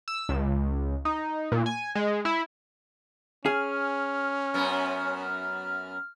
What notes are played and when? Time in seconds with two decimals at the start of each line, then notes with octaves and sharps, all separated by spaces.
0.08 E6
0.29 C#2
1.05 D#4
1.52 A#2
1.66 G#5
1.95 G#3
2.25 E4
3.46 C#4 G#4 F6
4.54 F#2 B3